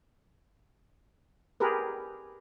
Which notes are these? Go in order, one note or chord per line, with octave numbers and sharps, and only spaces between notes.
G4 G#4 A#4 B4